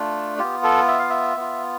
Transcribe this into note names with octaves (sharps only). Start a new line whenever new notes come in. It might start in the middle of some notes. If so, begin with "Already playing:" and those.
Already playing: A3 D4 F4
B3 F4 G4
A4
E5
F5
E5
B3 F4